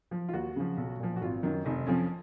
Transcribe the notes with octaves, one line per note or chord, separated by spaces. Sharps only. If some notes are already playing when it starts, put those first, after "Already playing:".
F3
F4
D#2 F#4
C#3 F3
B1
A#2 F3
F#4
G#1 F4
F#2 D#3
F1 D#4
F2 F3 C#4